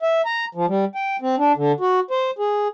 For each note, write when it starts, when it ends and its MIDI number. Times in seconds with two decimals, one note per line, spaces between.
0.03 0.21 76
0.26 0.45 82
0.55 0.66 53
0.68 0.85 55
0.95 1.16 79
1.22 1.35 60
1.38 1.52 62
1.57 1.72 50
1.80 2.00 66
2.11 2.31 72
2.39 2.68 68